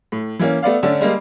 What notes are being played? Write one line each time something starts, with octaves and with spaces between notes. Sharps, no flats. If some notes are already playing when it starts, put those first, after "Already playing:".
A2
E3 A#3 C#4
A3 B3 D5 F5
D3 A3 C#4 D4
G3 G#3 A#3